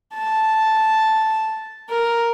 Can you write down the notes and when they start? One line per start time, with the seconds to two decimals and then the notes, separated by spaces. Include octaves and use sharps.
0.14 A5
1.90 A#4